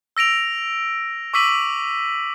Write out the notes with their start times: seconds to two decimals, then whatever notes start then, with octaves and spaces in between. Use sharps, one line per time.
0.17 E6 A#6 D7 F7
1.33 C#6 D6 E6 B6 D#7 F#7